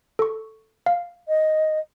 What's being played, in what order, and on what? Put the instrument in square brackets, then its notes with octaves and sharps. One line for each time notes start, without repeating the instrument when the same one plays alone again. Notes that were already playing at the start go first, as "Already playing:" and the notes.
[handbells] A4 C#6
F5
[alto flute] D#5